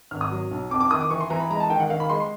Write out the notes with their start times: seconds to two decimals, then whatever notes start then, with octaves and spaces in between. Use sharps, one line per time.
0.11 G#1 F6
0.21 D#6
0.31 F#3
0.51 B1
0.70 F2 D6
0.80 D6
0.91 D#3 D#6
1.01 D6
1.10 E3 C#6
1.21 C6
1.30 E3 A#5
1.40 B5
1.50 G#3 A#5
1.60 A5
1.70 D#3 G5
1.80 F#5
1.90 D#3 F5
2.00 B5
2.09 G#3 C6
2.20 C6